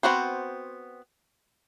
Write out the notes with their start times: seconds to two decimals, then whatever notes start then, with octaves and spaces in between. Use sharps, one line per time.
0.03 B3 C4 F#4 C5